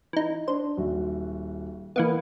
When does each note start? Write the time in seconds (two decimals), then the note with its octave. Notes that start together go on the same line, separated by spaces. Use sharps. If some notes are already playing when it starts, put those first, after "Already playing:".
0.13 E3 D#4
0.48 D4 C5
0.77 D#1 F#4 E5
1.96 E3 A#3 B3 D#5 C#7